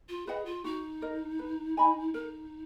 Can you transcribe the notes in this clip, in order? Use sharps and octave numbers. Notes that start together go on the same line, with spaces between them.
F4
G#4 B4 D#5 F#5
F4
D#4 F#4
A#4 D#5
B4
D#5 G#5 B5
D#4 A#4